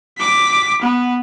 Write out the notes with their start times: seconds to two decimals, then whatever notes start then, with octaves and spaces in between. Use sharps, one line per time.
0.18 D6 B6
0.81 B3